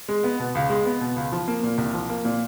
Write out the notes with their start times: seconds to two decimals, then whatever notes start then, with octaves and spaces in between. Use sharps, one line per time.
0.08 G#3
0.24 B3
0.40 B2
0.55 C#2
0.70 G#3
0.85 B3
1.01 B2
1.16 C#2
1.32 F3
1.48 A#3
1.63 A#2
1.78 C2
1.94 F3
2.10 A#3
2.25 A#2